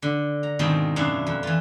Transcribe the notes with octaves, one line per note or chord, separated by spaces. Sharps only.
D3
A#5
G#2 B2 D#3 C4 F4 G5
F#2 B2 D4 E4 F5
F2
E3 F4